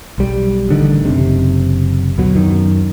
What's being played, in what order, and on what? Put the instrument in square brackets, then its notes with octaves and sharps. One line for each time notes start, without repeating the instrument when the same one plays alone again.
[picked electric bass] B1 G3
A1 D3 D#3
F#1 C3
D2 B2 F#3
F#2 D#3